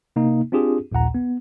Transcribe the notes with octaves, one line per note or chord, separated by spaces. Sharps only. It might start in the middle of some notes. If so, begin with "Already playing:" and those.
C3 A#3 D#4
C4 D4 F4 G4 G#4
A#1 D#2 A#2 F#5 A#5
B3